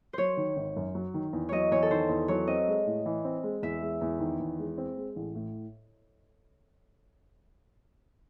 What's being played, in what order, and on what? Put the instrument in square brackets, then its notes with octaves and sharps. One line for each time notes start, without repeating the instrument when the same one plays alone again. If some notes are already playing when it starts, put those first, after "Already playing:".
[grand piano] F#3 [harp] C5 C#5
[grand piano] D#3
G#1
F#2
F#3
D#3
E2
[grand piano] F#3 [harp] C#5 D#5
[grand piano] E2 [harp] C#5
[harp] A4
[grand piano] D#3 [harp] C5
[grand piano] E2
[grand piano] F#3 [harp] C#5
[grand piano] C4 [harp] D#5
[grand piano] G#3
A2
E3
C4
G#3
[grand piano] E2 [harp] E5
[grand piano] G#3
E2
D#3
E2
G#3
C4
G#3
A1
A2